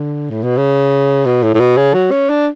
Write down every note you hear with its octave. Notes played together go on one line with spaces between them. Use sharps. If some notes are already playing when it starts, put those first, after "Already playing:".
Already playing: D3
A2
B2
C#3
B2
A2
A2
B2
C#3
F#3
C#4
D4